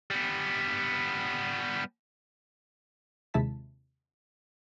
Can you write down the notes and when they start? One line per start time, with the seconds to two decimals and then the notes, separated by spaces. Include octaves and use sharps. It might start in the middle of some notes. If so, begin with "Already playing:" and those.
0.11 G3 B3
3.34 D#2 C3 G#3 E4 A5 B6